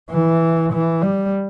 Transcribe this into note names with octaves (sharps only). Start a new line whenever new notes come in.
E3
E3
G3